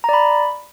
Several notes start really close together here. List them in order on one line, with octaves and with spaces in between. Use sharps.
A#5 D5 B5